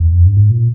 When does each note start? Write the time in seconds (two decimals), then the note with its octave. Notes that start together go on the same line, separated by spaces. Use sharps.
0.00 E2
0.12 F2
0.26 G2
0.37 G#2
0.51 A#2